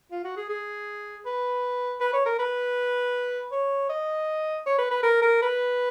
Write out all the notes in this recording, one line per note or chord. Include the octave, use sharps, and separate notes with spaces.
F4
F#4
G#4
G#4
B4
B4
C#5
A#4
B4
C#5
D#5
C#5
B4
B4
A#4
A#4
B4